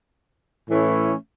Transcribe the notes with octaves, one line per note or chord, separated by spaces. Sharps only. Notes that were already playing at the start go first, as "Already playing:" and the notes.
A2 E3 A3 C#4 E4